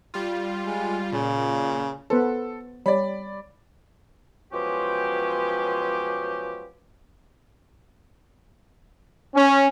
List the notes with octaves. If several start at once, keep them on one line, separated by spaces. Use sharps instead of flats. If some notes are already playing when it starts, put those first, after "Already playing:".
G3 F4
G#3
A#2 C#3
B3 A4 B4 C5
G3 C#5 D5 B5
B2 F3 F#3 G#3 C#4 G4
C#4